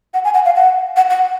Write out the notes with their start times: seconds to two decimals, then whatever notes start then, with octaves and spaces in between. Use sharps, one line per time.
0.14 F#5
0.25 G#5
0.34 F#5
0.45 F5
0.56 F#5
0.97 F#5
1.10 F#5